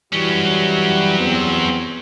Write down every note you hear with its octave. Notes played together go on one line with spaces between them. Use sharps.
E3 F#3 G3 C#4 F#4
E2 B3 C4